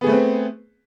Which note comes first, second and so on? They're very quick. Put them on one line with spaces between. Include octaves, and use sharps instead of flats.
B3 G#4 A3 B4 C4